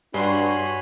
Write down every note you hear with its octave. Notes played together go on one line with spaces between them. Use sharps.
G2 D4 F#4 C#5 G#5 B5 C6